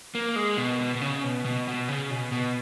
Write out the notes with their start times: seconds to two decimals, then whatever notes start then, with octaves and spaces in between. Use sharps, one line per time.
0.15 A#3
0.36 G#3
0.58 B2
0.80 B2
0.95 B2
1.01 C#3
1.24 B2
1.45 B2
1.68 B2
1.89 C#3
2.10 B2
2.32 B2